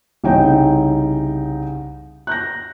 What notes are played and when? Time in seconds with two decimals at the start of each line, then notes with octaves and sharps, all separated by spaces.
0.24 C2 C#3 C#4 D#4 C#5 G5
2.27 F#6 G6 A#6